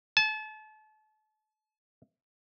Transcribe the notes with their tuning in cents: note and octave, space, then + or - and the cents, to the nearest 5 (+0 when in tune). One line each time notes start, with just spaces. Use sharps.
A5 -35